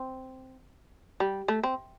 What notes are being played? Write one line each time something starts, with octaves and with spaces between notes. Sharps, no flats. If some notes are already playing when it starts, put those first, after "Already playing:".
Already playing: C4
G3
A3
C4